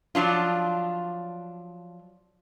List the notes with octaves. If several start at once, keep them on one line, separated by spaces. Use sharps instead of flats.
F3 F#3 D4 F4